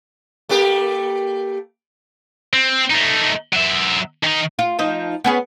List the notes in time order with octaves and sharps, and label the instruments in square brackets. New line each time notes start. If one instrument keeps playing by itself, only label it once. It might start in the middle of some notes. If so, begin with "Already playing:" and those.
[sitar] A3 A#3 G4
[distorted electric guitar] C4
A3 D#4
F#3 E5
D#3 D#4
[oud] F4
F3 D#4
B3 C#4 G#4